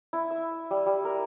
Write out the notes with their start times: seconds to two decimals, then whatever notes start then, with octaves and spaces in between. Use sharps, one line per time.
0.13 E4
0.31 E5
0.71 G3
0.86 G3
1.05 A#4